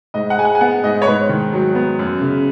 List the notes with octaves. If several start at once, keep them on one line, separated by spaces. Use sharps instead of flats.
G#2 D#5
F#5
G#3 G#5
F#5
G#5
B3 F#5
G#2 D#5
C#5
G#2 B4
D#3
F#3
B3
F#2
C#3